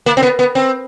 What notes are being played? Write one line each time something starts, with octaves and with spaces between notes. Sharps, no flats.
A#3
C4
B3
B3
C4